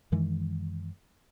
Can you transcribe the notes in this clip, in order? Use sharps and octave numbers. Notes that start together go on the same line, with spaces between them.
F#2 D#3 E3 G#3